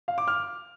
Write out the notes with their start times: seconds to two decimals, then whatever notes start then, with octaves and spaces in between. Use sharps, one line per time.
0.08 F5
0.18 D6
0.28 F6